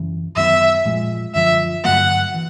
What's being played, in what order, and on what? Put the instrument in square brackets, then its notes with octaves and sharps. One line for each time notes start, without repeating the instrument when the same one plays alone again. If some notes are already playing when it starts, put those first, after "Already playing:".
Already playing: [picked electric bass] F#2 C#3 E3
[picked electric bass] F#2 D#3 F#3 B3 [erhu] E5
[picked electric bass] A#2 F3 G#3
[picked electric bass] F#2 D3 F3 [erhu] E5
[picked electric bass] G2 D3 F#3 A#3 [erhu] F#5
[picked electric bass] E3